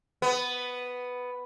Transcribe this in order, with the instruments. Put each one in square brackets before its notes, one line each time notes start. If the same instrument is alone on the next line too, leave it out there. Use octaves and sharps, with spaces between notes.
[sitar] B3